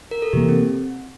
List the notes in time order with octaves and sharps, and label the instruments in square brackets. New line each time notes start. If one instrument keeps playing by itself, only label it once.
[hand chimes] A#4
A4
[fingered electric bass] C3 E3 A#3 [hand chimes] G4
[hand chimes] C4